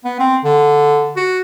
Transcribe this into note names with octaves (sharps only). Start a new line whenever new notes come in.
B3
C4
D3
F#4